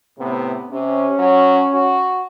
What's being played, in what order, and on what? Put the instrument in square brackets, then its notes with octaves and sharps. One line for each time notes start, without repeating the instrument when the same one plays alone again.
[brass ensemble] A2 C3 B3
[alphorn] C3 [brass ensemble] C#4
[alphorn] F#3
F#4